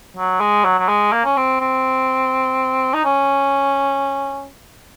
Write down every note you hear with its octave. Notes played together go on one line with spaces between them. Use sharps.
F#3
G#3
F#3
F#3
G#3
A#3
C#4
C4
C4
D#4
C#4